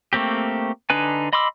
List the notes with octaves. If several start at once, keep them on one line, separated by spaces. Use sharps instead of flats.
A3 A#3 C4 G4
D3 D4 D#4 B4 G#5
D#5 B5 C6 D6 E6